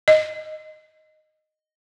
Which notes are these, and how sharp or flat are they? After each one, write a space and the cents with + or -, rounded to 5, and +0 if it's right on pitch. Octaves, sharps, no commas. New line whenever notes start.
D#5 -10